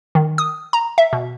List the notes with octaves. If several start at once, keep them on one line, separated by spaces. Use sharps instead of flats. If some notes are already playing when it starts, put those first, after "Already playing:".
D#3
D#6
A#5
E5
B2